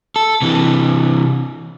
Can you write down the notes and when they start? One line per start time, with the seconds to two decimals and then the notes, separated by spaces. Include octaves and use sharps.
0.16 A4
0.42 C3 E3